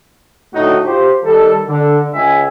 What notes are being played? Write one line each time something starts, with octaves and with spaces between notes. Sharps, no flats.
A2 D3 A3 D#4 F#4
F4 G4 C5
D#3 G3 A4
D3
C#2 C#4 G#4 E5 G#5